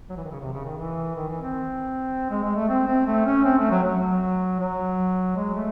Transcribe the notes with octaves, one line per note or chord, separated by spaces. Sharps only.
F#3
E3
D#3
C#3
C3
C#3
D#3
E3
D#3
E3
C4
G#3
G#3
A3
C4
C4
A3
C#4
C4
A3
F#3
F#3
F#3
G#3
A3